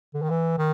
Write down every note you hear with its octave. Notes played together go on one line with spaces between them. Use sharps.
D3
D#3
E3
D#3